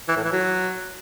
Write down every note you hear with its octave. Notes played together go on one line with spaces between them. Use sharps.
E3
A2
E3
F#3